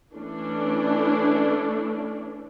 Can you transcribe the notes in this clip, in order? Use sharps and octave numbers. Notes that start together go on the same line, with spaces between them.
E3 A3 C#4 D4